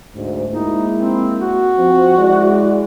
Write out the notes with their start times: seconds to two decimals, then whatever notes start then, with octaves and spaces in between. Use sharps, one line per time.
0.15 D2 G#2
0.52 G#3 A#3 D#4 E4
0.96 C4
1.40 F#4
1.78 F3 C4
2.18 G#3 E4 D5